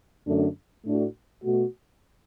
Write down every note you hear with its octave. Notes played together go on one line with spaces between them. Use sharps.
F#2 D3 A3 D4
A2 A3 D4 F#4
B2 A3 F#4